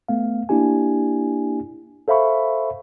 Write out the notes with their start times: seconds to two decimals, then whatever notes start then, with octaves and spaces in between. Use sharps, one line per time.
0.08 A3 B3 F5
0.49 A#3 D4 E4 G4 G#5
2.08 A4 C5 E5 F5 B5 C#6